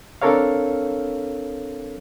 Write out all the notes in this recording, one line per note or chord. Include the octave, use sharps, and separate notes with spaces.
C4 D4 A4 A#4 C#5 F5